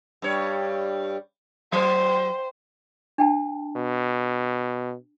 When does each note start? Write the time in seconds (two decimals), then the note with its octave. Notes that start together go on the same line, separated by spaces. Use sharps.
0.22 G2 G3 C#5
1.72 F#3 C5
3.18 D4 G5 A5
3.76 B2